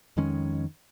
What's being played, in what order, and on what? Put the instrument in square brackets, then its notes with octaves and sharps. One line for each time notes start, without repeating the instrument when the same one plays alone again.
[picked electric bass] F2 D#3 G#3 C#4